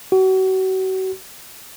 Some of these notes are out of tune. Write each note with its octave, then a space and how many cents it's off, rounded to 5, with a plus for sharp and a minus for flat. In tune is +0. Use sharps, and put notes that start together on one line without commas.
F#4 +35